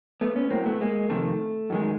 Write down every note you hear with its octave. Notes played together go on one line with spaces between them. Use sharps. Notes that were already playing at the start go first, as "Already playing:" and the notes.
A3 B3
B3 C#4
A2 F#3 A#3 C4
A3 B3
G#3 A#3
F2 C3 D#3 A3
F#2 D#3 G#3